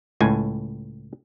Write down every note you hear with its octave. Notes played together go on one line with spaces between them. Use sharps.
C#2 A2 G#5